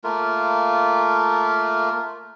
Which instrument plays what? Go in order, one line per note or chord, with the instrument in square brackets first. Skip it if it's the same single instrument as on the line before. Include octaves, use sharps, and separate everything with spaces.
[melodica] A3 A#3 F4 A#4